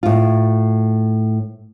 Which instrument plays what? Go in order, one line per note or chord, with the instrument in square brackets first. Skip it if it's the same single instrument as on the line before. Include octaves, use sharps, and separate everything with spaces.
[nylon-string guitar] A2 F4